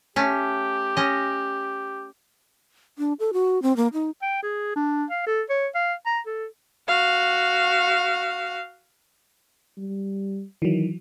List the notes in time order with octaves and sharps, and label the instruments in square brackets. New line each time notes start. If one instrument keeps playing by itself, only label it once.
[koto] A3 C#4 [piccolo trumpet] G4
[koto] C#4 D#5
[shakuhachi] D4
A4
F#4
C4
A#3
D#4
[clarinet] G5
G#4
D4
F5
A4
C#5
F5
A#5
A4
[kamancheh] F#4 F5
[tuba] G3
[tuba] D#3 [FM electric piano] E3 F#3